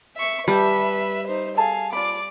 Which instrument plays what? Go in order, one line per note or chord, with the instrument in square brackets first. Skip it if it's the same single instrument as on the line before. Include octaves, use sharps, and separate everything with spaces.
[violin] E5 C#6
[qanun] G3 [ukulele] G4 A5 [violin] B4 E5
[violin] D#4 C5
[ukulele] G#4 A4 A5 [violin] F5 G#5
[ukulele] F4 B5 [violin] D5 D6